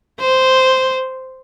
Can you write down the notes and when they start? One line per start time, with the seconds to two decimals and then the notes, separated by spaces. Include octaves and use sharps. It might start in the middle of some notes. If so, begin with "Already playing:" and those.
0.20 C5